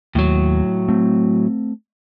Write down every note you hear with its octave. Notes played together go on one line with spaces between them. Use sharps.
D#2 A2 F#3
A3 C4